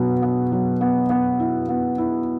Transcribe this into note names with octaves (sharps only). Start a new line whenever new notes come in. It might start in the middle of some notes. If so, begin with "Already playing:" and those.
Already playing: B2 F#3 B3
B3
F#3
B3
B3
E4
B3
E4